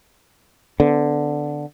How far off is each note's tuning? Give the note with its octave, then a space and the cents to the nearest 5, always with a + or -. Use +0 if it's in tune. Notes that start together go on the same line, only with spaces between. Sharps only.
D3 +0 B3 +30